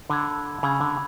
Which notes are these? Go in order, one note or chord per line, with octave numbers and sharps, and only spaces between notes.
D3 B5 E6 G#6
C#3 B5 E6 G#6
D3